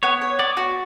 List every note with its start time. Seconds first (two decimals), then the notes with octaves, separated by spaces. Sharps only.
0.03 B3 C#5
0.21 C#5
0.39 B3 D5
0.57 F#4